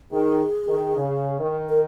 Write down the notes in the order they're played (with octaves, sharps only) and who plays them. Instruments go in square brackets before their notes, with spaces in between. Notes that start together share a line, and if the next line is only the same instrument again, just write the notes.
[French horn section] D#3 [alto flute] G#4
[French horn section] D#3
C#3
D#3
[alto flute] A#4